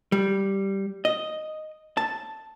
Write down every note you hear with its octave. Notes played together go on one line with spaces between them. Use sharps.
G3
D#5
A5